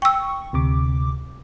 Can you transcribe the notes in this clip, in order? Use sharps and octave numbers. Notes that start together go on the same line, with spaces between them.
G5 C#6 E6
D2 C3 D6